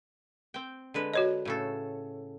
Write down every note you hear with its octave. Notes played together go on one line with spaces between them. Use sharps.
C4 G5
D3 G#3 B4
F#4 C#5 D#5
A2 C#3 A4